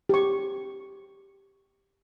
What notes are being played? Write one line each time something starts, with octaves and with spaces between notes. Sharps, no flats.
G4 C#6